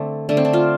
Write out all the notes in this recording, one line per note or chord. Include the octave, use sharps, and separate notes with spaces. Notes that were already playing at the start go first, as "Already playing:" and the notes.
Already playing: D3 A3 C4 D4
D3 A3 D4
C4
D4
F4